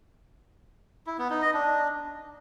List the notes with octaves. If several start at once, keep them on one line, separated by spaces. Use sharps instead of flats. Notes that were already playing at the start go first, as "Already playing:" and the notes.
E4
B3
D#4
D#5
D4